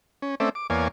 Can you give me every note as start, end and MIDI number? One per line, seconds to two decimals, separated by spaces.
0.22 0.35 61
0.40 0.49 57
0.40 0.49 60
0.40 0.49 61
0.40 0.49 74
0.40 0.49 76
0.55 0.67 86
0.70 0.88 40
0.70 0.88 58
0.70 0.88 73
0.70 0.88 74
0.70 0.88 77
0.70 0.88 80